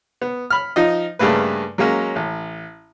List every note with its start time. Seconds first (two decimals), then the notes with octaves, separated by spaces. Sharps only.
0.22 B3
0.50 B5 F6
0.76 F3 D#4 F4 D#5
1.19 G2 C#3 A3 A#3 B4
1.78 F#3 G#3 A#3 C#4
2.16 A1